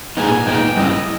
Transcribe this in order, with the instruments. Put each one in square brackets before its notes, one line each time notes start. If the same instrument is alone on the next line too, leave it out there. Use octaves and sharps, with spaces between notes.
[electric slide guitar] A#2 G#3 B3 D#4 [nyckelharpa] G#5
[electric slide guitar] A#2 G#3 B3 D#4 [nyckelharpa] G5
[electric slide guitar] G2 G3 C#4 E4 [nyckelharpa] D#5